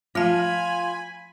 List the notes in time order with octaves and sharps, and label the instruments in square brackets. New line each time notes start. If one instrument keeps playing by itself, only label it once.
[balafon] F3 A3 A5 [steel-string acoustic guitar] F4 [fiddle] G#5 B5